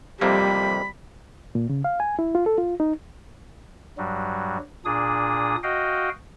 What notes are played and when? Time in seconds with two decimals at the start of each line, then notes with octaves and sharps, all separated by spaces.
0.21 F2 C3 G3 A#3 B5
1.55 A#2
1.70 C#3
1.84 F5
2.00 G#5
2.19 E4
2.35 F4
2.46 A4
2.58 F4
2.80 D#4
3.98 G2 F#3 G3
4.85 A#2 D4 G#4 D#6
5.63 F#4 D#5 F5 G5